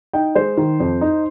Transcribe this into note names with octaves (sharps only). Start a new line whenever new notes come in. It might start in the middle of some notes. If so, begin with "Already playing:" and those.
D#4 G5
G#3 C5
D#3
F2
D#4